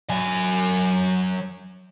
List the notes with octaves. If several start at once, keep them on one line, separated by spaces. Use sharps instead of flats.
F#3 G#5